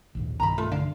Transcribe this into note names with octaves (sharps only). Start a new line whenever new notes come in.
A#1 D#2 G#2
B1 G2 D#3 A#5 B5
A3 F4
D3 F5